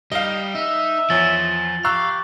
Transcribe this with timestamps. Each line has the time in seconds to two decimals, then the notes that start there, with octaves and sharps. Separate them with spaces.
0.12 G3 D#4 D#5 F5 G7
0.55 D#4 E5
1.10 E2 F3 C#5 A6 F#7 G7
1.85 G4 F5 A#5 C#6 E6 F#6